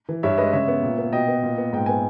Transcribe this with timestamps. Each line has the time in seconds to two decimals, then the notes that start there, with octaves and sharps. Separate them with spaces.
0.09 E3
0.23 G2 C#5 E5
0.38 G#3 B4 D#5
0.53 C#3 C#5 E5
0.68 B3
0.83 A#2
0.98 B3
1.13 B2 D#5 G5
1.28 B3
1.43 A#2
1.58 B3
1.72 G#2 G5
1.86 B3 G#5